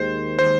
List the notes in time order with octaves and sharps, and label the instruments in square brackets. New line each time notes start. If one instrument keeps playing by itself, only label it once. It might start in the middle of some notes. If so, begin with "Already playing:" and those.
Already playing: [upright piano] D#2 D#3 G#3 [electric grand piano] C5
[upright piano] D#3 G#3 [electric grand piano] C5